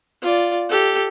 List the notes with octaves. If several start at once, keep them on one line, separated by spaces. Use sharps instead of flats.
F4 D5
G4 A4